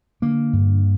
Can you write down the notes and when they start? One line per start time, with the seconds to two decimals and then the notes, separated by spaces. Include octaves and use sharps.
0.22 D3 A#3
0.53 G2